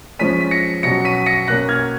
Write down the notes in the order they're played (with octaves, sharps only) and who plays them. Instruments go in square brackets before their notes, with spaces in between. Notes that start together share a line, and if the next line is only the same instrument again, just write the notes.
[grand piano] F3 G#3 C#4 B6 D#7
B6
A#6 C#7
B2 F#3 C#4 A#6 C#7
B6 D#7
A#6 C#7
B2 A#3 C#4 F#6 A#6
F6 G#6